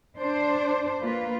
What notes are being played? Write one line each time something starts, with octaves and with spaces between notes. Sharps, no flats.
D4 C5
A#3 F4 B4